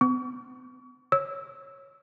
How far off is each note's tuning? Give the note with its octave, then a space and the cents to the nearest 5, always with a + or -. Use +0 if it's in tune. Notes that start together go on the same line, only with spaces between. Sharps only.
B3 +45 C#6 +35
C#5 -10 E6 -15